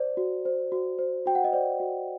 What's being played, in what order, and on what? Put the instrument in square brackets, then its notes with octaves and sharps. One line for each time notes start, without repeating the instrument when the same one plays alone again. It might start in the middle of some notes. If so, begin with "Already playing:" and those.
Already playing: [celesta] C5 D5
F#4
C5
F#4
C5
F#4 G5
F#5
D#5
C5 D5
F#4